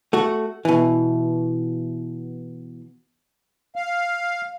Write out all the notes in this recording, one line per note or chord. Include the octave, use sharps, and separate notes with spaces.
A3 F#4
B2 E3
F5